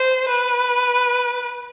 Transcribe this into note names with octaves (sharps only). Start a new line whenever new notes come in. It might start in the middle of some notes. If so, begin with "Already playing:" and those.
Already playing: C5
B4